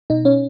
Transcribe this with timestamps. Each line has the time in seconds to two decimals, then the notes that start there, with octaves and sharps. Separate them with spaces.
0.10 B2 D#4
0.25 C#4